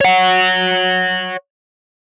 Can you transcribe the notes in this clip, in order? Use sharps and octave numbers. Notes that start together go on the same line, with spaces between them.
C#5 F#5